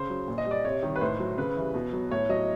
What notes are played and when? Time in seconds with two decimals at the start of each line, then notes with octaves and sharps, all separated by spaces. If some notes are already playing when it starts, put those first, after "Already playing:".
Already playing: C#3 C5
0.10 F#3
0.28 A#2
0.38 D#5
0.46 G3 D5
0.65 C3 C#5
0.83 D#3 G3
0.96 B4
1.01 A2 C5
1.20 F#3
1.38 C#3 B4
1.56 E3 G3
1.74 B2
1.93 F#3
2.11 A2 C#5
2.29 F#3 D#5